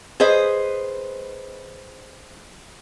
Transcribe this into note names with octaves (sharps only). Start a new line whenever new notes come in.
G#4 B4 C5 D#5